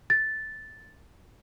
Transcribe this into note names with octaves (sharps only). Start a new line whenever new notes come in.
A6